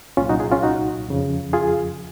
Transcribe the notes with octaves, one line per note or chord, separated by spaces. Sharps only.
C2 A#2 F#3 C#4 F4
D#4 F#4
F4 G#4
C#4 F4
D#4 F#4
F2 C#3 F3
F4 G#4